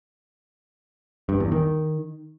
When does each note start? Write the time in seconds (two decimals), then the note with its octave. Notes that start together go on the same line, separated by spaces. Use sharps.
1.29 G2
1.40 E2
1.52 D#3